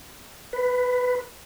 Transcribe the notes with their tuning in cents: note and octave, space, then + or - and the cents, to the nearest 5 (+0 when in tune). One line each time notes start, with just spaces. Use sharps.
B4 +10